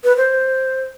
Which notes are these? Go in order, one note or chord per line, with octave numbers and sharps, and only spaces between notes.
B4
C5